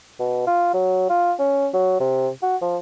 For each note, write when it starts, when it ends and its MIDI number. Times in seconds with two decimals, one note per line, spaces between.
0.20 0.44 47
0.47 0.70 65
0.74 1.09 54
1.10 1.33 65
1.39 1.68 61
1.74 1.97 54
2.00 2.29 48
2.42 2.57 66
2.62 2.78 53